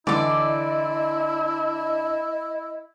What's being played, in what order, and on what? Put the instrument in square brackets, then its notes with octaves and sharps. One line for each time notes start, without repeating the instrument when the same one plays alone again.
[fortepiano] D3 E3 [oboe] E4 [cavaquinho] D5 D6 [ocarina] D#5